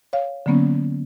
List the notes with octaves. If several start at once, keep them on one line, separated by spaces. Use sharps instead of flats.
C#5 F5
D3 F#3 A#3 B3 C#4